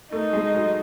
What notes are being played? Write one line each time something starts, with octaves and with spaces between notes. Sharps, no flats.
A3 D#4
G#3
F#3